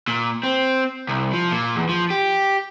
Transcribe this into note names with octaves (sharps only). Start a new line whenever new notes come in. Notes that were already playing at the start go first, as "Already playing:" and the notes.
A#2
C4
C2
F3
A#2
E2
F3
G4